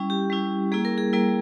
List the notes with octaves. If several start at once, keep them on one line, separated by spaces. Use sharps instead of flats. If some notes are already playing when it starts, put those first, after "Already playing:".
Already playing: G3 C#4 E4
G4
G3 C#4 E4
G3 A#3 E4 G#4
A#4
G#4
G3 A#3 E4 A#4